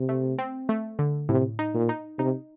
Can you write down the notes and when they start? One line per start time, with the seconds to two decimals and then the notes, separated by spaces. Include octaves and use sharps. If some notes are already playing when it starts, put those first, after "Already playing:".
Already playing: C3
0.09 A3
0.39 C4
0.69 A3
0.99 D3
1.29 A2 C3
1.59 D#4
1.74 A#2
1.89 D#4
2.19 C3 D#4